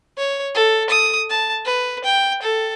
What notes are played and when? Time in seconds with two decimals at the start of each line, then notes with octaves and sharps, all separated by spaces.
0.18 C#5
0.55 A4
0.90 D#6
1.30 A5
1.65 B4
2.05 G5
2.42 A4